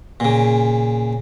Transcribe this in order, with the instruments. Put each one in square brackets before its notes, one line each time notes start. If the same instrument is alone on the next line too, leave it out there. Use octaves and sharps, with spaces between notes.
[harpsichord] A#2 C#3